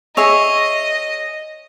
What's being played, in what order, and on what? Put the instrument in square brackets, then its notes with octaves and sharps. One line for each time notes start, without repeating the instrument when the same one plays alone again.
[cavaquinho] G#4 C#5 E5 [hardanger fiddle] D#5